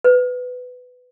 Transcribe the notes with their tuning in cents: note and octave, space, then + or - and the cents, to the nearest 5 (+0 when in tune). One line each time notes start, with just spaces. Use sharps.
B4 +15